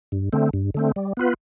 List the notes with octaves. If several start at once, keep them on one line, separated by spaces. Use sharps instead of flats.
G2
D3 A3 C4
G2
D3 A3 C4
G3
B3 F4 B4